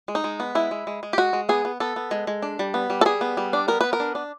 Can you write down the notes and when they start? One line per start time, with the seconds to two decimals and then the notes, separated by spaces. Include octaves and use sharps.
0.08 G#3
0.15 D#4
0.24 G#3
0.40 B3
0.55 G#3 E4
0.71 G#3
0.87 G#3
1.03 G#3
1.13 G4
1.18 G#3 F#4
1.33 G#3
1.49 B3 G#4
1.65 B3
1.80 B3 A4
1.96 B3
2.11 G#3
2.27 G#3
2.42 D4
2.59 G3
2.74 B3
2.90 G3
3.01 A4
3.05 G3 G#4
3.21 B3
3.37 G3
3.53 D4
3.68 B3 A#4
3.81 B3 B4
3.93 A#4
4.00 D4
4.15 D4